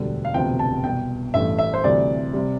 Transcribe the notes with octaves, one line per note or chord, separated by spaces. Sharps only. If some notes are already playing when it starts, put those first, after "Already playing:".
Already playing: E1 D2 D3 G3
F5
E1 D2 C3 F3 B3 G5
A5
C2 B2 B3 G5
A1 G2 E3 A3 E5
E5
C5
D2 C3 E3 G3 D5
C3 G3